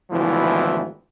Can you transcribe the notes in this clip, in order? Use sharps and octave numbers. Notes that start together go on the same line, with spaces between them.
G#1 D2 B2 E3 F3 E4